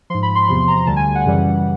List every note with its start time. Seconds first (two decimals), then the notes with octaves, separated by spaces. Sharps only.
0.10 F3 C6
0.14 G#2
0.23 B5
0.35 C6
0.49 E2 C3 F3 C6
0.68 A#5
0.87 D2 D3 G3 A5
0.96 G#5
1.15 F#5
1.25 F#2 C#3 E3 G3